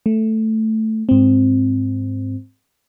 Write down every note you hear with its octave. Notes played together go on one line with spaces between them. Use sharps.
A3
G#2 C4